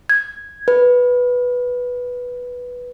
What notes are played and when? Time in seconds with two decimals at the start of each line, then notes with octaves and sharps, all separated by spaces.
0.10 G#6
0.68 B4